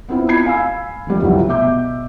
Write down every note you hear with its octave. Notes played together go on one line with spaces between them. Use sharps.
B3 C4 E4 F4
B5 G#6 C7
F5 G#5 B5 E6
D#3 F3 G3 G4
G1 C2 F#3
B2 E5 D6 G6